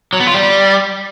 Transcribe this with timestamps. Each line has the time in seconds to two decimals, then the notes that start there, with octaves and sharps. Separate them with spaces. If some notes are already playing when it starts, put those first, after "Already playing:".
0.13 F#3
0.20 B3
0.27 F4
0.34 G3